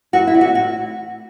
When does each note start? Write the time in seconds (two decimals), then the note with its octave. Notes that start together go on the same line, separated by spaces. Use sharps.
0.13 F#2 F#4
0.27 E4
0.34 E3 G3 C4
0.41 F#4
0.55 A2 F#4